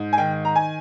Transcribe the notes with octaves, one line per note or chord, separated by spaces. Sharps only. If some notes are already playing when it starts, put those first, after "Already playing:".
Already playing: G#2
G#5
D#3 G5
A#5
G#5